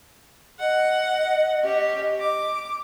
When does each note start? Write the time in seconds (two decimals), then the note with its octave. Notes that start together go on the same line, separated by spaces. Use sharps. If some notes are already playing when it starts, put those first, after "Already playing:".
0.60 D#5 F#5
1.62 C#4 G4
2.20 D6